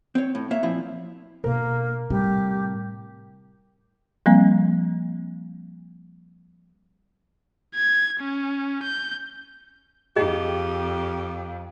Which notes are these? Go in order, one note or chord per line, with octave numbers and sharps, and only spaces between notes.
C4 C#5
A2
A#3 C#5 E5
A#2 F3 C4 E4
B2 A#3 D4 A#4
A2 C3 G3 G4
F3 G3 A#3 C4
G#6
C#4
G6
F2 G4 G#4 D#5